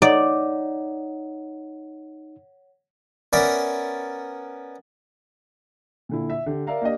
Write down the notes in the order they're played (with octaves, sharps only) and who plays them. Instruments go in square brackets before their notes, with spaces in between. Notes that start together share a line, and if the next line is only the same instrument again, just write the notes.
[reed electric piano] D#4 [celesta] C#5 F#5 [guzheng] D5
[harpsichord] B3 C#4 A#4 D5 E5
[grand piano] A#2 D3 E4
E5
D3 G4
A#4 D5 E5 F5 A#5
A#3 D4 G4 D#5